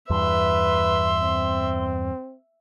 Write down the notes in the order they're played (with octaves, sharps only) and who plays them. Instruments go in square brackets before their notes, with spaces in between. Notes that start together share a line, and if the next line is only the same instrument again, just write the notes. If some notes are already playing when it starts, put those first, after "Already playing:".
[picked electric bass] E2 G2 [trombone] B4 [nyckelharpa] E5 [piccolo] C6
[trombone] C4